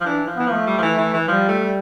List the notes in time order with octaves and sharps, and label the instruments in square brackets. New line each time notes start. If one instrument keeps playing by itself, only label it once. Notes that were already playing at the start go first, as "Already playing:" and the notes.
[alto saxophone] F3
[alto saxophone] E3 [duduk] D4
[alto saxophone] F3
[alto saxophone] E3 [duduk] B3
[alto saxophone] F3
[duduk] A3
[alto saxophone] G3
F3
E3
E3
E3
[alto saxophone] F3 [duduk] G3
[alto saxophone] A3
[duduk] G3